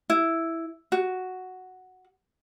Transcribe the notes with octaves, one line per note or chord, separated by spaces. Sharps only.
E4
F#4